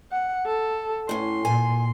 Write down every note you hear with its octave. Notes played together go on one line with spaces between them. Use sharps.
F#5
A4
A2 C#4 C6
A#2 G#5